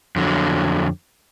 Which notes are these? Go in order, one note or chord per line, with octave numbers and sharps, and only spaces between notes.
F2 D3 F#3